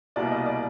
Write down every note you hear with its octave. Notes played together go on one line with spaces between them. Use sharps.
C2 B2 G3 A#3 D5
D#5
D5